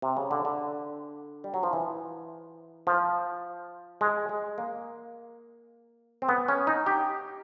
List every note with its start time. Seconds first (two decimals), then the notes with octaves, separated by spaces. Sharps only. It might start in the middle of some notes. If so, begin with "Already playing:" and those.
0.02 C3
0.17 C#3
0.31 D3
0.45 D3
1.44 G3
1.54 F#3
1.63 F3
1.73 E3
2.87 F3
4.01 G#3
4.29 G#3
4.58 A#3
6.22 C4
6.29 B3
6.48 C#4
6.67 D#4
6.86 G4